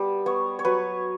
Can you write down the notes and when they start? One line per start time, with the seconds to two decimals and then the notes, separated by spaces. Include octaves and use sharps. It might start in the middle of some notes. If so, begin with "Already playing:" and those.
Already playing: G3 B3
0.26 B3 C#5
0.59 C#5
0.65 F#3 B4